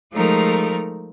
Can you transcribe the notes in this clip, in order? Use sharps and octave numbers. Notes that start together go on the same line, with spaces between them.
F3 G#3 A3 D#4 A#4